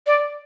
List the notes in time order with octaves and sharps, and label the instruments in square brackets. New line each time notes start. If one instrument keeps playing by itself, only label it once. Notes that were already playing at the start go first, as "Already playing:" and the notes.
[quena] D5